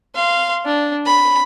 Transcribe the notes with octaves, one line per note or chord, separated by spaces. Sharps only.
F5 C6
D4
B5